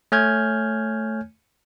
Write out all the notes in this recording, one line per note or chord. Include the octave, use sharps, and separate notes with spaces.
A3 C#5 G#5 F6 G6 G#6